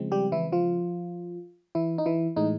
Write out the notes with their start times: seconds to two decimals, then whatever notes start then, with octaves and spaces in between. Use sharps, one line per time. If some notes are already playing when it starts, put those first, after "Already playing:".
Already playing: C#3 F3 G#3 C4
0.12 G3 G4
0.32 E3 E4
0.52 F3 F4
1.75 E3 E4
1.98 D#4
2.06 E3 E4
2.36 A2 E3 G#3 D#4